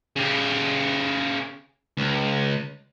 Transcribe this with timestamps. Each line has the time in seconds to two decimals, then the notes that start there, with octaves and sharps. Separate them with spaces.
0.16 C#3 G4
1.97 C#2